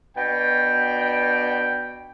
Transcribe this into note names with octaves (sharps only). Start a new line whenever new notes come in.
B2 D4 G5